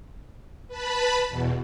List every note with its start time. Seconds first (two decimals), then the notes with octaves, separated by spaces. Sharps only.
0.68 B4 A5 B5
1.28 E2 B2